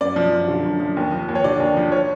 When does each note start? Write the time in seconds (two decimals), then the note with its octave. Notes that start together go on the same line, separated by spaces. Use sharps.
0.01 F#2 D5
0.16 F3
0.32 F#2
0.48 D3
0.64 F#2
0.80 F3
0.97 D#2
1.12 F3
1.28 D#2
1.35 C#5
1.44 D3 D5
1.60 D#2
1.77 F3
1.92 C#5